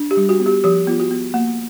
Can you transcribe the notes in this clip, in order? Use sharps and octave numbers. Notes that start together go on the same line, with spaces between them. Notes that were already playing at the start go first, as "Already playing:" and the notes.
Already playing: D4
G4
G3
F#4
B3
G4
F3 G4
B3 F4
F#4
B3
A#3